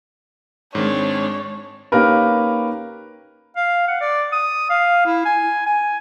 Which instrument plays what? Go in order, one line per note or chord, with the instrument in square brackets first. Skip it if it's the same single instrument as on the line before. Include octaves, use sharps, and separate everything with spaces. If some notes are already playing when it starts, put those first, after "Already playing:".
[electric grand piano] G#2 D#3 C4 [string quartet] G#3 D4 [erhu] C#5
[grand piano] A#3 C#4 D#4 G4 A#4 B4
[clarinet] F5
F#5
D5
D#6
F5
E4
G#5
G#5